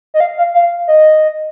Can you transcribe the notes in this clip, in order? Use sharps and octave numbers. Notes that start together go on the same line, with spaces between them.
D#5
F5
F5
F5
D#5